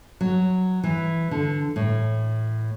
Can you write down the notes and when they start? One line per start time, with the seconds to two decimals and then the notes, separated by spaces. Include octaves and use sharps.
0.21 F#3
0.84 E3
1.31 D3
1.76 A2